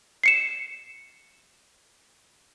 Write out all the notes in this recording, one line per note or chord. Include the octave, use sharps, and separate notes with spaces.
C7 C#7 E7